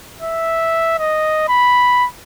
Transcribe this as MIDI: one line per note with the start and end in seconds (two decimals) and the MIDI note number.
0.21 0.96 76
0.99 1.45 75
1.49 2.07 83